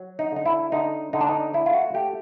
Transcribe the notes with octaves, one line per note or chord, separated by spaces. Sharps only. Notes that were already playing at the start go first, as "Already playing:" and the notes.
Already playing: F#3
D#4
D3 D#4
E4
D3 D#4
D3 D#4
D4
D#4
A3 E4
F4
F#4
A3 G4